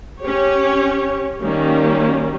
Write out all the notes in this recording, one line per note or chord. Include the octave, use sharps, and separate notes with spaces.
C#4 G4 C#5
D#3 G3 A#3 C#4